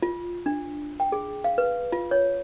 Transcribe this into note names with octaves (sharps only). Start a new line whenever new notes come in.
F4
D4
G5
G#4
F5
B4
F4
C#5